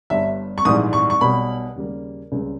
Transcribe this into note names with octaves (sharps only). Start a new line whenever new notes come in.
G1 G2 G3 E5
C#6
A#1 G#2 E3 G3 D#6
C#6
C#6
B1 B2 G3 B5
D#2 C#3 G3 A#3
C#2 C#3 G3 A#3